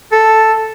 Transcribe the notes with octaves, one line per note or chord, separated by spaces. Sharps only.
A4